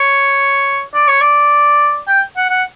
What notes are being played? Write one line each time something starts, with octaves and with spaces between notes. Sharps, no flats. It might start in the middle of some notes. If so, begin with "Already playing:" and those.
Already playing: C#5
D5
C#5
D5
G5
F#5
F#5